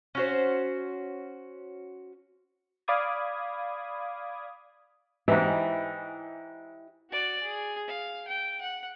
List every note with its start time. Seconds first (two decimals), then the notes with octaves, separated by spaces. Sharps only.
0.15 C#4 F#4 C5
2.88 D5 F5 B5 D6 D#6 G#6
5.28 G#2 E3 E4 G4 D#5
7.10 F#4 D5
7.43 G#4
7.88 F5
8.27 G5
8.61 F#5